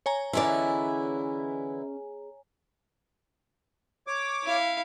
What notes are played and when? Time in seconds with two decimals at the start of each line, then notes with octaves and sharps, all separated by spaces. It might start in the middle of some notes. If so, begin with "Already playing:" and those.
0.06 C#5 G#5 A#5
0.33 D3 E3 B3 C#4 E4 G#4 D5 D#5
4.07 C#5 D6
4.44 E4 F5